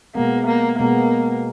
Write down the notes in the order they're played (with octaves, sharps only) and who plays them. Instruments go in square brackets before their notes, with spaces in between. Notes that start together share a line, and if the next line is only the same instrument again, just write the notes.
[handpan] B2 G#3 B3 [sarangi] A#3
[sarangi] A#3
[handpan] B2 G#3 B3 [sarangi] A#3